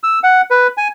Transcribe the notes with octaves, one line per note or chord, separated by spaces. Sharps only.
E6
F#5
B4
G#5